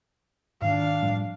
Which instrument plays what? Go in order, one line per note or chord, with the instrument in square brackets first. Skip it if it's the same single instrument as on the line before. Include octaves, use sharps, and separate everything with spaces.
[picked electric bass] G#2 D#3 [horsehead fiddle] D4 F5
[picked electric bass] A2 F3 G3